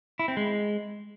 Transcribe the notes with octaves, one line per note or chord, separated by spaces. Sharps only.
E4
C4
G#3